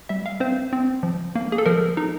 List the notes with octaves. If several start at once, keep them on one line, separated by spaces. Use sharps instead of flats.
G3 E5
F5
C4 C5
C4
F3
A#3
G#4
A4
F3 A#4
D#4